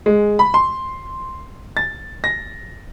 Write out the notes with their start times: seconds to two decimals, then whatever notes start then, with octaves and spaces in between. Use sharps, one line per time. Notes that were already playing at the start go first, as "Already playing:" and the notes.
0.06 G#3
0.39 B5
0.54 C6
1.77 A6
2.24 A#6